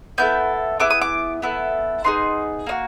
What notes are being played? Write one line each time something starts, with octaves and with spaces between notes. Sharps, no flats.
B3 E4 A4 G6
B3 E4 G#4 D6
D#6
D6
B3 E4 A4
B3 D#4 G#4 C6
A#3 D#4 F#4